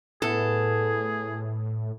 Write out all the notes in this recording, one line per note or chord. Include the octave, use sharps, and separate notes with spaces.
A2 B3 E4 G#4 A4